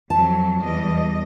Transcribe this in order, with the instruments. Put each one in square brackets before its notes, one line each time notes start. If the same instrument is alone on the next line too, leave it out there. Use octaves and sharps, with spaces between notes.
[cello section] F2 F#3 [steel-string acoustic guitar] A5
[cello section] E2 G3 D#5